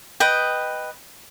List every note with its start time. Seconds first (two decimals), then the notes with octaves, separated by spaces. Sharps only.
0.20 B4 D#5 G5